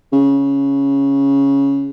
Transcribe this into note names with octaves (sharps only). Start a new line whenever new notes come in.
C#3